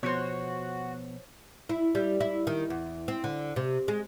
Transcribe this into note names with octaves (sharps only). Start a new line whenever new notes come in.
B2 F3 B3 F#4 C5 C#5
E4
G3
E4
D#3
E2
C4
D3
C3
G#3